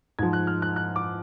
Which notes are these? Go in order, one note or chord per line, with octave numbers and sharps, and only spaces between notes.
G#2 F3 G#6
F#6
F6
F#6
F#6
D6